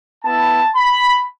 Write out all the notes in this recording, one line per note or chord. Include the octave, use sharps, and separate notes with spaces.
B3 E4 A5
B5